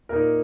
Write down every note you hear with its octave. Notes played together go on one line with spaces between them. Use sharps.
A#2 A#3 D#4 A#4